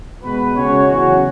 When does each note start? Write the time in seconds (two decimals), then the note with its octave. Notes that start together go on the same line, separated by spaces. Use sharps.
0.22 B2 G#3 B3 F#4 B4
0.55 C#3 G#3 C#4 F#4 C#5
0.87 E2 C#3 F#3 C#4 F#4